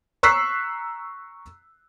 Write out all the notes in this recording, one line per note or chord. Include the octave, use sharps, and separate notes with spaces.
A#5 C#6 E6 F#6 B6 C7